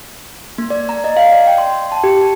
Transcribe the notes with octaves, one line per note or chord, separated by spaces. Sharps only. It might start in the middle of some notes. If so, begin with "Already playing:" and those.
A#3
D5
A#5
D#5
F5
D5
G5
C6
A5
G4
A5